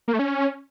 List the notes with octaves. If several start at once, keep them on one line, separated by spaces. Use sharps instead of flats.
A#3
A3
C#4